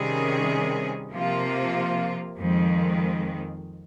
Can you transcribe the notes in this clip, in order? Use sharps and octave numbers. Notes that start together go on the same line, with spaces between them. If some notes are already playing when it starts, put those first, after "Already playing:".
Already playing: C3 D#3 G3 C#4 G#4
C3 F3 A#3 F4
F2 D#3 G#3